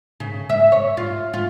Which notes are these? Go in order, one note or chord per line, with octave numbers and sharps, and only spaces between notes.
C#3
E5
C#5
F4
F4